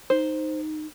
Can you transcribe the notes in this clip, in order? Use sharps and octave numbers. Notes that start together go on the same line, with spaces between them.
D#4 C5